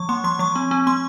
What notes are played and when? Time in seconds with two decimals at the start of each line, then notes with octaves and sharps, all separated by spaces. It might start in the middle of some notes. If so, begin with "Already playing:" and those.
Already playing: F3 C#6
0.09 A#3 C6
0.24 F3 C6
0.39 F3 C#6
0.56 C4
0.71 C4
0.87 C4 C6